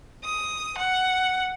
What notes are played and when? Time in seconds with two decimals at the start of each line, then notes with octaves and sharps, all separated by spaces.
0.24 D#6
0.77 F#5